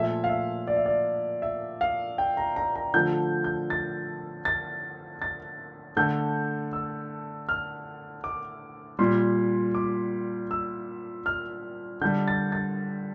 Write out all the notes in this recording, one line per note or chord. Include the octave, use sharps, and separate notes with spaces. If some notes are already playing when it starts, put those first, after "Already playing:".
Already playing: A#2 F3 A3 E5
F5
E5
D5
E5
D5
E5
F5
G5
A#5
A#5
A#5
D3 F3 A3 G6
G6
A6
A6
A6
D3 A3 G6
E6
F6
D6
A#2 G3 C6
D6
E6
F6
D3 G3 G6
A6
A6